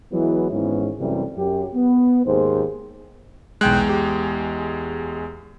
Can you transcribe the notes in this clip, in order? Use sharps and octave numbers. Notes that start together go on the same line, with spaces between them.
E3 F#3 G#3 B3 E4
G#1 G#2 E3 B3 C#4 E4
F#2 C3 E3 G3 A3
F#2 G4
B3
D#2 G#2 G#4 C5
B1 E2 G#3 G5 F#6
G4